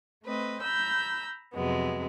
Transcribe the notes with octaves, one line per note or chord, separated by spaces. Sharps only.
A3 C4 B4 D#5
A#5 B5 E6 G6
F2 C3 F#3 G#3 B3